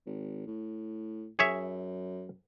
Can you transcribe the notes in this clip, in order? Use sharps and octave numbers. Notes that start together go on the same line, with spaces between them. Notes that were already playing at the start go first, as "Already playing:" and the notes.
G#1
A2
F#2 G#4 C#5 E5